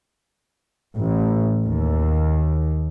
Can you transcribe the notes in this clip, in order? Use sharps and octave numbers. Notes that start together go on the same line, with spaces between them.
A1
D#2